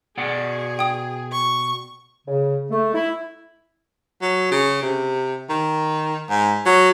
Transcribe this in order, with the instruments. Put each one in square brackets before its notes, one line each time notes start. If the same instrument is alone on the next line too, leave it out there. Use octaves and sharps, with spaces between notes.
[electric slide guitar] B2 D5 F#5 [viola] G#4
[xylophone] G5 D#6
[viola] C#6
[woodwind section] C#3
A3
E4
[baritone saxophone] F#3
C#3
C3
D#3
G#2
F#3